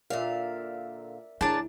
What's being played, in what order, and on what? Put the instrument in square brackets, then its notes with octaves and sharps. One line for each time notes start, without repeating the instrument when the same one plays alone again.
[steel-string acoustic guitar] A#2 D3 F5 [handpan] A#4 D5 E5
[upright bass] D2 E4 [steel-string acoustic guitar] A2 G#4 A#4 [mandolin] D4 A5